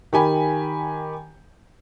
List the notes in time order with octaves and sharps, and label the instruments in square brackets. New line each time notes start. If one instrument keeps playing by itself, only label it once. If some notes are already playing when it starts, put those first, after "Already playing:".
[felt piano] D#3 G4 G#5 B5